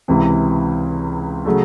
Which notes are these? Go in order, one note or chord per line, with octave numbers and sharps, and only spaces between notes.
C#2 C3 E3
C#3 F#3 A3